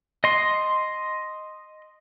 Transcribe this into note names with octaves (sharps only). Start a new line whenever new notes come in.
D#5 C6